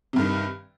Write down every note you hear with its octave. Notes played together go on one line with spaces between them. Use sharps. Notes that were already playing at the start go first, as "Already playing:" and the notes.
G2 C3 D#3